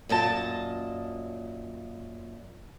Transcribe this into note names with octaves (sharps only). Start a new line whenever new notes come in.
F#2 A#2 D#5 A5